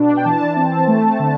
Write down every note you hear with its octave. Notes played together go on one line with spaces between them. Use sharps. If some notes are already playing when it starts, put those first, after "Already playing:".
Already playing: B2 D4
G5
E3 A5
C4
A3
D3